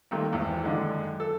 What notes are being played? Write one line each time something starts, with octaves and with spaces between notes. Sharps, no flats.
C2 D#3 A3 A#3
G#1 E2
F#2 D3 D#3 G#3
A4